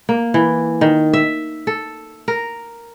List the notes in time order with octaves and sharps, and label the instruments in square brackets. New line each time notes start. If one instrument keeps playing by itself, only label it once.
[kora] A#3
E3
D#3
E5
A4
A#4